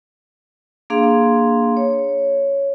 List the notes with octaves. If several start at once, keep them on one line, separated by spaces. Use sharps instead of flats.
A#3 D4 G#4 F5 C6
C#5